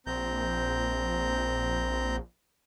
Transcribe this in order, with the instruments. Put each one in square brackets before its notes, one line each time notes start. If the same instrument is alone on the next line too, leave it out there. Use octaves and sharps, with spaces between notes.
[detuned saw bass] A#1 [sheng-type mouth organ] C4 A#5 G6